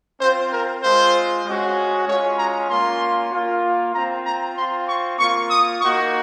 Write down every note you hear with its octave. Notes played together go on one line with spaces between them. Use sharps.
C4 F4 C5
A#4
G#3 C4 F4 C5
G#3 C#4 F#4
G#3 C#4 F4 C#5
A#5
A#3 C#4 F4 C6
A#3 F4
C4 F4 A#5
A#5
C4 F4 C6
C#6
A#3 F4 C#6
D#6
A#3 D#4 F#4 C#6